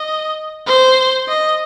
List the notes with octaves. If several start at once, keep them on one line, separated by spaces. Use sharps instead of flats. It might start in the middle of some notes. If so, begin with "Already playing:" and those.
Already playing: D#5
C5
D#5